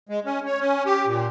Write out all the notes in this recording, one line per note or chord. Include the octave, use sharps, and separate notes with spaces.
G#3
C#4
C#5
C#4
G4
A#2